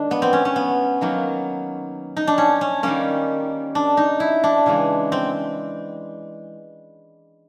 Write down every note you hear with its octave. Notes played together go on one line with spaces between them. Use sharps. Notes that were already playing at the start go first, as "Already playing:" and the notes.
Already playing: D#3 G#3 D4
B3
C4
C#4
C#4
B3
D#3 F#3 A#3
D#4
D4
C#4
C#4
D#3 G3 A#3 C#4
D4
D#4
E4
D4
C#3 E3 G#3
C4